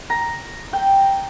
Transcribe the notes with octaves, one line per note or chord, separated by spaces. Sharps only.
A#5
G5